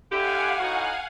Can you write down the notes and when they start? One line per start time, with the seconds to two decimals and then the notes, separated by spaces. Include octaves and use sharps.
0.12 D3 E4 G4 F5 F#5 G#5
0.60 A2 D#4 F#4